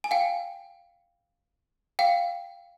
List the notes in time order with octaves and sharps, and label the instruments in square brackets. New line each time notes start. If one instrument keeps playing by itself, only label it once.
[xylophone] G#5
F5 G5
F5 G5